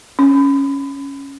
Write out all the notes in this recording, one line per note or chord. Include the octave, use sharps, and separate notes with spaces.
C#4